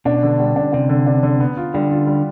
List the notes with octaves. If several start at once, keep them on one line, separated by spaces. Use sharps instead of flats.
B2 D4
D3
G3
D4
C3 D4
D3
D4
D3
B3
F4
D3 G3
F4
G3